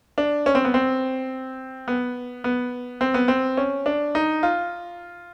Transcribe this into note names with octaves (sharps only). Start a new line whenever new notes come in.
D4
C#4
C4
B3
C4
B3
B3
C4
B3
C4
C#4
D4
D#4
F4